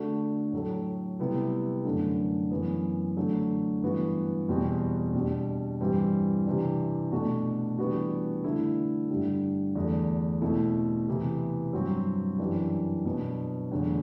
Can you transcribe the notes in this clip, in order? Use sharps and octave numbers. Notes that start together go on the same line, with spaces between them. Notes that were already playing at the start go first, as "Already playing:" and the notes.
Already playing: D3 A3 D4 F#4
A2 F#3 A3
C3 G3 B3 E4
F#2 D3 A3
F#2 E3 B3
D3 F#3 A3
G2 E3 B3 F#4
E2 B2 G3 C4 F#4
B2 G3 D4
G2 E3 G3 C4 E4
C3 E3 G3 D4
B2 A3 D4 F#4
E3 G3 B3 D4 F#4
D3 A3 E4
G2 D3 G3
E2 D3 A3 D4
B2 A3 C4 E4
C3 E3 B3
G2 F#3 C4 F#4
F#2 E3 G3 D4
B2 F#3 B3 D4
E2 D3 F#3 A3